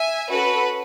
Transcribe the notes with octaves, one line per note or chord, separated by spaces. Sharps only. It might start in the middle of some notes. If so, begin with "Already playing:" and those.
Already playing: E5 G#5
C#4 F#4 A4 B4